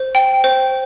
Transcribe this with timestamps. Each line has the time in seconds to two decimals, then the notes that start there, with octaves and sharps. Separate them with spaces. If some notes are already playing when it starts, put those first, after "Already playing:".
Already playing: C5
0.15 G5
0.44 C5